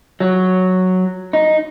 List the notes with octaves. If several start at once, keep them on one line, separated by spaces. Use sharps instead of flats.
F#3
D#4